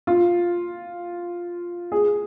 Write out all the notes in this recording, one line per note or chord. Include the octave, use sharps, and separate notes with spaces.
F4
G#4